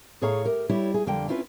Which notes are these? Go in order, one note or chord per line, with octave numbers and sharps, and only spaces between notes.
A2 G#4 A4 C#5 F5 A#5
G4 A#4
G3 E4 G4 C#5
G#4
F2 D3 G3 A#3 G5
C4 C#4 E4 F4 G4 B4